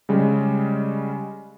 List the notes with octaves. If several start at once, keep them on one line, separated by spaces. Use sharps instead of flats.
C#3 G3 G#3